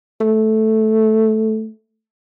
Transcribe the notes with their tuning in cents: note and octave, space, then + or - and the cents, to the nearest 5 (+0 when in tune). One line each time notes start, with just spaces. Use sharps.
A3 -5